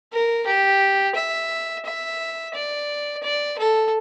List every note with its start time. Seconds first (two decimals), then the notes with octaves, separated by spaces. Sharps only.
0.12 A#4
0.46 G4
1.15 E5
1.85 E5
2.54 D5
3.23 D5
3.58 A4